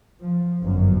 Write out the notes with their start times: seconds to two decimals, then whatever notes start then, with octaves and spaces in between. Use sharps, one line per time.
0.21 F3
0.61 G1 F#2